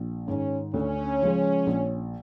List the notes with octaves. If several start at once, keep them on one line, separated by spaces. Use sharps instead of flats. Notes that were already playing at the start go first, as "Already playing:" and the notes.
Already playing: A#1
G#2 D#3 C#4
D2 C#4
C#3 F3 G#3
A#1